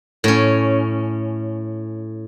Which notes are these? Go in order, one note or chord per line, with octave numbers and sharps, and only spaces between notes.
A2 C#4